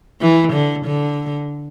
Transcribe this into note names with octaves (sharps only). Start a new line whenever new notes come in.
E3
D3
D3